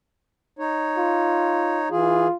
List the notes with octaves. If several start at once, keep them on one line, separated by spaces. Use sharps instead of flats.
D#4 C#5
F4
E3 F4 G#4